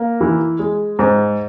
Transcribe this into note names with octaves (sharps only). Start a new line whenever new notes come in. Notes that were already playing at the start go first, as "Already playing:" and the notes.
Already playing: A#3
E3
G#3
G#2